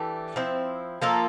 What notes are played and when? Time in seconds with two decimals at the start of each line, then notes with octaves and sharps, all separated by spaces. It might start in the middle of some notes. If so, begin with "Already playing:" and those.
Already playing: E3 A3 D4 G4
0.36 F3 C4 E4
1.01 F3 A#3 F4 A4